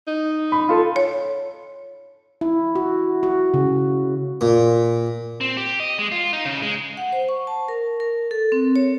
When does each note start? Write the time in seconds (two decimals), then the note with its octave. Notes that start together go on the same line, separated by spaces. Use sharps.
0.08 D#4
0.52 B5
0.69 F4 A4
0.96 C#5
2.41 E4
2.75 F#4
3.23 F#4
3.54 C#3
4.41 A#2
5.41 C4
5.57 G4
5.80 D#5
5.99 G#3
6.12 F4
6.33 D#4
6.45 C#3
6.62 G#3
6.97 F#5
7.13 C5
7.29 C#6
7.47 A5
7.68 A#4
8.00 A#4
8.31 A4
8.52 C4
8.76 C#5